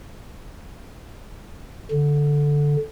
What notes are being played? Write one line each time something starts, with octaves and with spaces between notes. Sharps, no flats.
D3